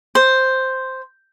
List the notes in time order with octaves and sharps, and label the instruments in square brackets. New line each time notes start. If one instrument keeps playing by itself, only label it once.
[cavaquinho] C5